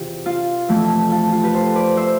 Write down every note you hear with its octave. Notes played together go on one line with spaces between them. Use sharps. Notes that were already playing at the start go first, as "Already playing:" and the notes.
Already playing: E2 C3 E3 E4 F4 G4
F4
F2 E3 A3 E4
F4 A4
F4 A4
G4 B4
A4 C5
B4 D5
C5 E5